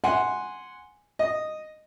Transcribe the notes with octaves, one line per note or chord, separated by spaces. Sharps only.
F#5 G#5 C6
D#5